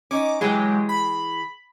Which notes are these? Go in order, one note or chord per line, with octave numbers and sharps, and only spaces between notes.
C#4 D#4 D6
E3 F#3 G#3 G4 G#4
B5